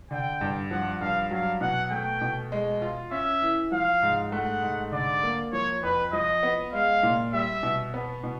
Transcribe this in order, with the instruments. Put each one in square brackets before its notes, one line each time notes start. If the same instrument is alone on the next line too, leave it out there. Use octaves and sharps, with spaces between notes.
[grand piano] D3 [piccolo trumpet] G5
[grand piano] G2
[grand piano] F3 [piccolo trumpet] F#5
[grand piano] G2 [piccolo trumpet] F5
[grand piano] F#3 [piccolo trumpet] F5
[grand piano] B2 [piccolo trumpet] F#5
[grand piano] A3 [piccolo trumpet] G5
[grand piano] B2
G#3
F4
[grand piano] C#4 [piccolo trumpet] E5
[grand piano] E3
[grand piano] F3 [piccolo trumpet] F5
[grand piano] G#2
[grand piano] A3 [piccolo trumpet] F#5
[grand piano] G#2
[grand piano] D3 [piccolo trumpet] D5
[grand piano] A#3
[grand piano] F3 [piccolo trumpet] C#5
[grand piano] F2 [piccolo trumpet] B4
[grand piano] F3 [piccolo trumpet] D#5
[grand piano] B3
[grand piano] G#3 [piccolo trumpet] F5
[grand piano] A#2
[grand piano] G3 [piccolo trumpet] E5
[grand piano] B2
B3
B2